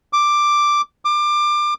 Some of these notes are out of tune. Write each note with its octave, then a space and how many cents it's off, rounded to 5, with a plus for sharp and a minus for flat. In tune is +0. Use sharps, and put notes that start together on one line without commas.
D6 +5
D6 +25